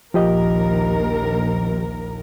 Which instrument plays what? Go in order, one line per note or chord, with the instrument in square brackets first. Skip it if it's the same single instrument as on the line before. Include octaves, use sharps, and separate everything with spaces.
[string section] A#1 D#2 A#4 [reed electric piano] F3 G4 D#5